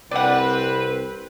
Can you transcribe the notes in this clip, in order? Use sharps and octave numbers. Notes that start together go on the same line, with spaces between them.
C2 C4 B4 D5 F#5